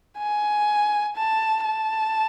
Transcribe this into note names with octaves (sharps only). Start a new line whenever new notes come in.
G#5
A5
A5